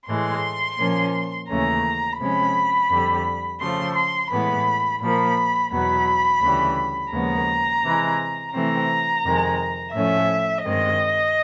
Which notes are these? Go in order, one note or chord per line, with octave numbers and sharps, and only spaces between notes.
A2 E3 G#3 C6
A#2 F3 A#3 C#4
D#2 C#3 E3 A3 C#4 A#5
C3 F3 G#3 C#4 B5
F2 D3 G3
C#3 F3 A3 C6
C6
A2 E3 G#3 B3 B5
A#2 F3 A#3 B5
E2 B2 F#3 B3 B5
D2 C#3 E3 G3
D#2 C#3 F3 G#3 B3 A#5
C3 E3 G#3
C3 E3 A3 C4 A#5
F2 C3 D#3 G#3
A2 F3 A3 C#4 E5
G2 D#3 G#3 C4 D#5